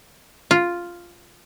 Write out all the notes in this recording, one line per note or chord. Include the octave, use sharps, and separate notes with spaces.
F4